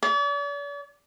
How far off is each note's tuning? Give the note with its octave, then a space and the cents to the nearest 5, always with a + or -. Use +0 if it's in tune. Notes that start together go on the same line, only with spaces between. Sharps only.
D5 -45